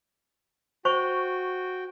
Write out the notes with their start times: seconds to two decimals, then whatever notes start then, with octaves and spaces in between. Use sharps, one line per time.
0.85 F#4 C5 G5 C#6